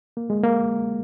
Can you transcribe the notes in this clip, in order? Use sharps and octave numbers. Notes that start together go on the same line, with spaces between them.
A#3
G#3
A#3